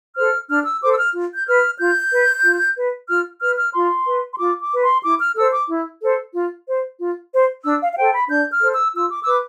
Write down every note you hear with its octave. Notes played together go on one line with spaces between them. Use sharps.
A4 C5 F6
D4 F6
E6
A4 C5 D6
E6
F6
F4
G6
B4 F6
F4 G6
B4
F4
B4
F4 F6
B4 F6
F6
F4 C6
B4
C6
F4 D6
D6
B4
C6
E4 D6
F6
A4 C5 E6
D6
E4
A4 C5
F4
C5
F4
C5
D4 E6
F5
F5
A4 C5 G5
B5
D4 G6
F6
A4 C5
E6
F4 E6
D6
E6
B4 D6